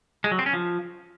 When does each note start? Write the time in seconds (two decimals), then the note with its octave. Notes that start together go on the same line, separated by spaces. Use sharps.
0.24 G#3
0.31 F#3
0.39 C4
0.46 C#4
0.53 F3